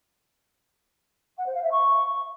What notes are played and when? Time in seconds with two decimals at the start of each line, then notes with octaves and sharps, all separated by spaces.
1.37 F#5
1.46 C5
1.54 F5
1.63 E5
1.71 C#6